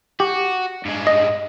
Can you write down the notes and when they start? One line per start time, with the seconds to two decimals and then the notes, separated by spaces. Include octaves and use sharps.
0.20 F#4 G4
0.85 G2 G#3
1.07 D#5